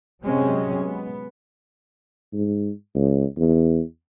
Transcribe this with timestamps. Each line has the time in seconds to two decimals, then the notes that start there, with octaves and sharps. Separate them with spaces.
0.23 C3 F#3 G#3 C4 C#4
0.81 B3
2.33 G#2
2.95 C#2
3.37 E2